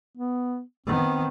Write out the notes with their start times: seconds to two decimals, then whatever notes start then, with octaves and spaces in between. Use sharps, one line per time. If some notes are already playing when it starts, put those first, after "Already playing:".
0.17 B3
0.87 D#3 B3 C4